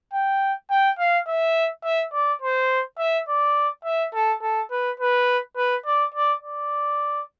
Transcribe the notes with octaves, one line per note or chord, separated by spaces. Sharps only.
G5
G5
F5
E5
E5
D5
C5
E5
D5
E5
A4
A4
B4
B4
B4
D5
D5
D5